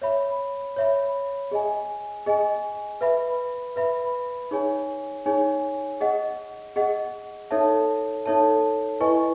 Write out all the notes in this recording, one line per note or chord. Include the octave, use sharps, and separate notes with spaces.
C#5 E5 B5
C#5 E5 B5
G#4 D#5 G#5
G#4 D#5 G#5
B4 E5 B5
B4 E5 B5
D#4 G#4 C#5 G#5
D#4 G#4 C#5 G#5
G#4 D#5 F#5
G#4 D#5 F#5
D#4 A4 C#5 E5 A5
D#4 A4 C#5 E5 A5
E4 B4 D#5 G#5 C#6